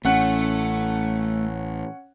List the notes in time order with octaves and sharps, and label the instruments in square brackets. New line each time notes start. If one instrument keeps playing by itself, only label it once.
[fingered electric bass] A1 [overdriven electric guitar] A3 [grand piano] C#4 F#5